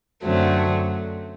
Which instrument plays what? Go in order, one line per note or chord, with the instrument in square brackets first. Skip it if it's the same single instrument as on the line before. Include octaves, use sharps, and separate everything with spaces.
[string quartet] F#2 D3 F#3 A3 C4